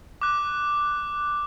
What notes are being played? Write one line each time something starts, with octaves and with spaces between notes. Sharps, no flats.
D6 F#6